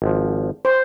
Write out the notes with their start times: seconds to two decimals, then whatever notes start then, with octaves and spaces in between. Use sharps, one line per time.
0.02 G#1 F3
0.65 C5